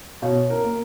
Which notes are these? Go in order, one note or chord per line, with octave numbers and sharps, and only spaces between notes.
B2 C#5 F5
A#4
A#3